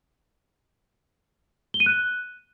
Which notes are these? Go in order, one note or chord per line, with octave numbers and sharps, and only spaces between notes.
G7
D#7
F#6